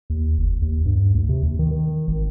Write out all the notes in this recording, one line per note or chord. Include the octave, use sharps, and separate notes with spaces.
D#2
F#1
D#2
G2
D2
C3
D#2
D#3
D#3
G#1